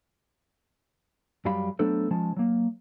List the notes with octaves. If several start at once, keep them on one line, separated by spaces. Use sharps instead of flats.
F#2 F#3 G3 F5 B5
F#3 A3 B3 D4 A4 C5
F3 G#3 C#4 A5
F#3 A#3